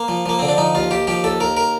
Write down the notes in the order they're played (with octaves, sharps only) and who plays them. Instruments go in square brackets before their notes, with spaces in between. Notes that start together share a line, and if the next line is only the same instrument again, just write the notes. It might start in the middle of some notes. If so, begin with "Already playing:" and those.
Already playing: [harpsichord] A#3
F3
F3 A#3
D3 C4
D4
F3 D#4
D#2 F4
D#2 G4
F3 G4
D#2 A4
D#2 A#4
A#4